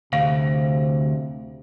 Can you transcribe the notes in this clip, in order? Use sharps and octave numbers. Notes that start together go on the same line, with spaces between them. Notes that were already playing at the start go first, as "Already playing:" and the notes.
D2 C3 F5